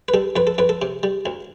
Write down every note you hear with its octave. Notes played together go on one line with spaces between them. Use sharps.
B4
G3 A4
F2 B4
A4
F2 B4
A4
C3
G3
D2